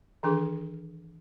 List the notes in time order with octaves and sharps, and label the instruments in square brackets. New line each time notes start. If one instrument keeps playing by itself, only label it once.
[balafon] D#3 E3 D4 G#4